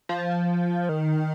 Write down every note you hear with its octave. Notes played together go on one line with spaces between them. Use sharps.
F3
D#3